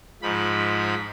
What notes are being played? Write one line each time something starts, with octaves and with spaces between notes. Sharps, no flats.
G#2 F3 B5